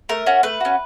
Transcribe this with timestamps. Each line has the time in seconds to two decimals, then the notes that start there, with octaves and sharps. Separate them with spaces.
0.09 A3 A#4
0.26 C#4 F#4
0.43 A3 B4
0.60 C#4 F#4